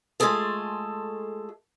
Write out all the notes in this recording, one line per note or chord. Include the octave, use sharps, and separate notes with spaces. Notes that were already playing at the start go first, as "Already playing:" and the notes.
G#3 A3 F4 G#4 A4